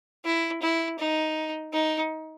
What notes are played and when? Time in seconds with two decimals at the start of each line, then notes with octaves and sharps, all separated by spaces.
0.25 E4
0.62 E4
0.98 D#4
1.73 D#4